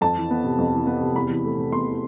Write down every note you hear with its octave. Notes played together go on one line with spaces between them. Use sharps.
F2 A5
E3
B3
C3
F2
E3
B3
C3
E2 B5
E3
A3
C3
E2 C6
E3